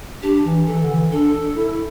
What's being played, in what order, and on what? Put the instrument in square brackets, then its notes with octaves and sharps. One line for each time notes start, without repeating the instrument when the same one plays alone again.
[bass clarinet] D4 [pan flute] G4
[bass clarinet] E3
[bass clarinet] E3 [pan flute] A4
[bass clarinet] D3
E3
[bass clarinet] D4 [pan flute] A4
[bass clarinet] E4